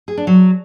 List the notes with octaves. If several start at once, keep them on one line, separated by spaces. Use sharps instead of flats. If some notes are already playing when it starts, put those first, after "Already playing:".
G#4
D4
F#3